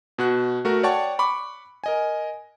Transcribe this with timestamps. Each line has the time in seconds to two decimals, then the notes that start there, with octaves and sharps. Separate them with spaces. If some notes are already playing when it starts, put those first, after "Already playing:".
0.18 B2 F#4 F#6
0.65 A3 F#4 A#4
0.83 C#5 D5 F#5 G5 A5 C#6
1.19 B5 C#6 D6
1.84 A#4 D#5 G#5